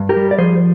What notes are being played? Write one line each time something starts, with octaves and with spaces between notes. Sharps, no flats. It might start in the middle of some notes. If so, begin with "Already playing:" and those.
Already playing: G2
G4 A#4
G3
D5
F3 G#4 C5